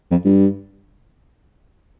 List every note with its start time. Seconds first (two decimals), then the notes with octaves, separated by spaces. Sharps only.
0.11 F2
0.25 G2